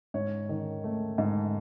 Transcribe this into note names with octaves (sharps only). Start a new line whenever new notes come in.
G#2 C#5
D#3
A3
G#2